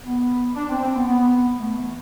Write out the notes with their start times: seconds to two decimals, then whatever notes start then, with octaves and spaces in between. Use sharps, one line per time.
0.05 B3
0.55 D4
0.69 C4
0.82 C4
0.95 B3
1.07 B3
1.59 A3
1.76 E3